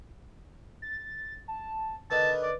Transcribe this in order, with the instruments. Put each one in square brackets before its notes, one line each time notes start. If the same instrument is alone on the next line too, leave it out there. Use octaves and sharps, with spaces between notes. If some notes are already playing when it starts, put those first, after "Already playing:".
[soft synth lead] A6
A5
[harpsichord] D3 D#3 [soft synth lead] B4 [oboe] A5
[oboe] D5